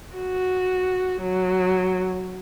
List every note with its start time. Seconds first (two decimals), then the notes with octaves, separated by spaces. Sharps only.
0.16 F#4
1.22 F#3